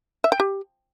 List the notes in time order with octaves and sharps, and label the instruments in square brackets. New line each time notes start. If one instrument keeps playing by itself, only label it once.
[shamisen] E5
G5
G4